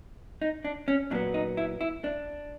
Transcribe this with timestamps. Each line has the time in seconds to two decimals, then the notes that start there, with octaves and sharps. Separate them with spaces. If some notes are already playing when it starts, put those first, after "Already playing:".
0.42 D#4
0.65 D4
0.88 C#4
1.11 A#2 F#3 B3 D4
1.34 D#4
1.57 E4
1.81 E4
2.04 D4